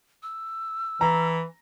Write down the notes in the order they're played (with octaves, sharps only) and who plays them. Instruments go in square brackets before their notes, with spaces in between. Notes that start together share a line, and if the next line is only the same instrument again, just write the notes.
[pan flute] E6
[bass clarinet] E3 [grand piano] A#5